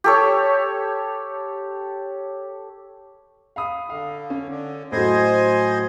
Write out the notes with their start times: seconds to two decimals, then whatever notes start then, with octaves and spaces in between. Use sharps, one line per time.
0.04 G4 A4 C#5
3.56 F5 B5 D#6
3.90 D3 F5
4.30 C#4
4.49 D3
4.92 A2 F#3 C5 D#5 G#5